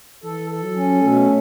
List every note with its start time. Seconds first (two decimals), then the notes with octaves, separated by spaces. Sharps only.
0.24 E3 A4
0.50 A4
0.63 F#3
0.76 C#4
1.01 B2 A3